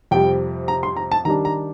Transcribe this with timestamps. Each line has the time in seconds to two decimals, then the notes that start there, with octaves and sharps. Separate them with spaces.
0.11 F2 C3 G3 G5
0.68 A#5
0.83 C6
0.97 A#5
1.12 A5
1.25 D#3 G3 D4 A#5
1.45 A#5